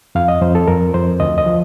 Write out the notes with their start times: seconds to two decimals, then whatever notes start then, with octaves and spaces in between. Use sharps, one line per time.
0.15 F2 F5
0.28 D#5
0.42 F2 C5
0.55 A4
0.68 F2 A#4
0.94 F2 C5
1.20 D2 D#5
1.38 D#5
1.46 F3